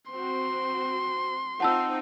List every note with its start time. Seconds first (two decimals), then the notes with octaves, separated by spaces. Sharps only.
0.11 C4 F#4 C6
1.60 C4 D#4 F4 F#5 A5 E6